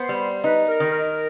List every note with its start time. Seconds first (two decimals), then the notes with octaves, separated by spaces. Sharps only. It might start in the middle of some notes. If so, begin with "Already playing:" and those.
Already playing: B3 C5
0.09 G3
0.44 D#4 B4
0.68 A#4
0.80 D#3
0.91 A#4